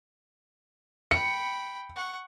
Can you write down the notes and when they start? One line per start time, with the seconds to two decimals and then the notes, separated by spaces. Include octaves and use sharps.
1.11 G5 B5 C#7
1.96 F#5 C#6